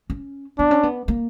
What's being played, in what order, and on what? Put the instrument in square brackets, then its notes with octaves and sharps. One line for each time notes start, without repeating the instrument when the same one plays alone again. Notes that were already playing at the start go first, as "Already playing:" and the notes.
[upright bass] C#4
[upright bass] B3 [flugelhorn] D4
[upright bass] C#4
B3
A#3